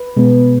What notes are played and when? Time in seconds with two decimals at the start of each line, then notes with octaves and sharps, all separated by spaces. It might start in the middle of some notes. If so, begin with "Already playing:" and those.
Already playing: B4
0.16 B2 G#3 B3